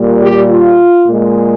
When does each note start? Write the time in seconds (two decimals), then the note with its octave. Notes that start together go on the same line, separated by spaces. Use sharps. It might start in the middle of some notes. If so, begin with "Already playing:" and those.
Already playing: A#2 G3
0.21 G4
0.50 F4
1.08 A#2 G#3